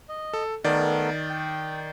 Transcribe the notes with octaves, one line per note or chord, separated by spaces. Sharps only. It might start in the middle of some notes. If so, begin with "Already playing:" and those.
D#5
A4
D#3 A3 B3 A#4 D5
G5